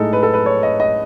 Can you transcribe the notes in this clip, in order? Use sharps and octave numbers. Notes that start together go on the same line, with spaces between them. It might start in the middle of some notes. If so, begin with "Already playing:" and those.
Already playing: A2 G#3 D#4 A4
B4
A4
B4
C#5
D#5
D#5